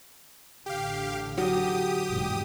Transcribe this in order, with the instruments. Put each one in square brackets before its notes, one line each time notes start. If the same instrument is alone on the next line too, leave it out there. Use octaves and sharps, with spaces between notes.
[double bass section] A1 D3 [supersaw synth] G4 F5
[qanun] F#3 [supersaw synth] G4 D#6
[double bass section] F1 E2 G#2